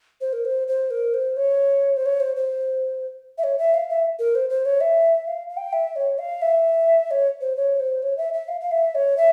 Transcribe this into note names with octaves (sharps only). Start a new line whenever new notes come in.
C5
A#4
C5
C5
A#4
C5
C#5
C5
C#5
C5
C5
E5
C#5
E5
F5
E5
A#4
C5
C5
C#5
E5
F5
F5
G5
E5
C#5
F5
E5
C#5
C5
C#5
C5
C#5
E5
E5
F5
F5
E5
C#5
E5